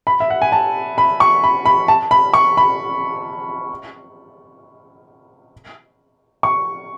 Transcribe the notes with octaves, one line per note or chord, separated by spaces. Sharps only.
B5
E5
F#5
G#5
A5
B5
C#6
B5
B5
A5
B5
C#6
B5
C#6